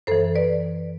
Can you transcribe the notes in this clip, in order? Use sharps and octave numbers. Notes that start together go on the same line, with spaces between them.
F#2 E3 A4 C5
B4 D5